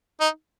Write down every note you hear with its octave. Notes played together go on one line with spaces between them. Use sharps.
D#4